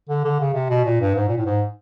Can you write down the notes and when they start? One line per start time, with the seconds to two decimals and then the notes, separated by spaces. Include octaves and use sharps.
0.09 D3
0.24 D3
0.40 C#3
0.54 C3
0.70 B2
0.85 A#2
1.01 G2
1.15 G#2
1.29 A#2
1.38 A2
1.45 G#2